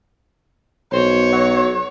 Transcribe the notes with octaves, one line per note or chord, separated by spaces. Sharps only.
B1 C5 C#5
F#3